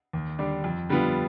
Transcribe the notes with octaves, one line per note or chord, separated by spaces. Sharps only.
D#2
D3 G3 D4
F2
D3 G3 B3 F4